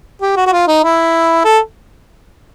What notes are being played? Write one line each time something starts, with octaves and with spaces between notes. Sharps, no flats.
G4
F#4
F#4
F4
D#4
E4
A4